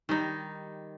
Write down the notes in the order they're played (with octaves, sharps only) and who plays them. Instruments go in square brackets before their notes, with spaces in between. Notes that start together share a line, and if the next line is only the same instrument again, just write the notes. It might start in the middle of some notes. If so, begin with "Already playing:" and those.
[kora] D#3 G3 D#4